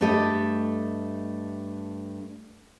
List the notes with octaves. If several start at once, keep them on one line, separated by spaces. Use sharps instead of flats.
G2 A3 G4 A4 D#5